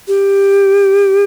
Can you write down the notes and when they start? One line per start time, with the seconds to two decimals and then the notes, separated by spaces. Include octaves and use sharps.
0.08 G4